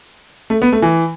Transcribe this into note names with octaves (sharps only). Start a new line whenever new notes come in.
A3
B3
A3
E3